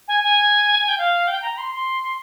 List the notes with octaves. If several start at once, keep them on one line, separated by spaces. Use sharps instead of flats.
G#5
G#5
G5
F5
G5
A#5
C6
C6